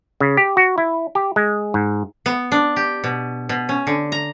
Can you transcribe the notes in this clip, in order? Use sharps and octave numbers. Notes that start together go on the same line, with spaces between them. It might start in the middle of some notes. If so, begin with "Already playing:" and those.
C#3
G4
F#4
E4
G4
G#3
G#2
B3
D4
G4
B2
B2
C#4
D3
A#5